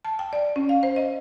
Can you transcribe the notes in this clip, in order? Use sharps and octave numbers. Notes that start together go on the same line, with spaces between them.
A5
G5
D5
C#4
F5
C5
D#5